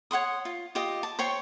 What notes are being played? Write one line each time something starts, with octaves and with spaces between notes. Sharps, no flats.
C#5 F#5 C6 D#6
F4
F4 G4 D#5
A5
C5 C#5 G5 C#6